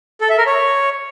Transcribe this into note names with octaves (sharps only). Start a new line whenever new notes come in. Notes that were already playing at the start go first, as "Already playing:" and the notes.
A4
E5
A#4
C#5